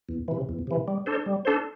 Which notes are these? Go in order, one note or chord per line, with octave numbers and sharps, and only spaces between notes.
E2
C3 E3
E2
C3 E3
G3
D4 A4 C5
G3
D4 A4 C5